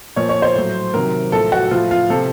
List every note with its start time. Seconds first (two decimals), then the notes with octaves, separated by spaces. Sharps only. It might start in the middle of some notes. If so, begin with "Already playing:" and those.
0.16 A#2 F3 C#5
0.29 C#5
0.42 C5
0.55 A2 F#3
0.94 C3 D#3 F#3 A#4
1.32 A2 F3 A4
1.52 F#4
1.71 A2 F3 F4
1.91 F4
2.10 C3 F3 A4